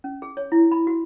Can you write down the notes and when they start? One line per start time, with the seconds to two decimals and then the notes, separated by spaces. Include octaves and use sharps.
0.04 C#4
0.22 G#4
0.37 C#5
0.52 E4
0.72 B5
0.87 F#4